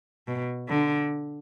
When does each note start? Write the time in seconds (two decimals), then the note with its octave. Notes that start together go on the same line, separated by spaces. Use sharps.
0.27 B2
0.69 D3